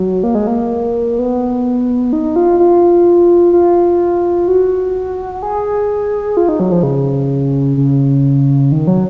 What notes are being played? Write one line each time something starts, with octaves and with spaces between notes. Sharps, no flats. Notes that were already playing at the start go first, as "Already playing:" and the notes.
Already playing: F#3
A#3
G#3
A#3
B3
D#4
F4
F4
F4
F#4
G#4
F4
D#4
F#3
F3
C#3
C#3
D#3
F#3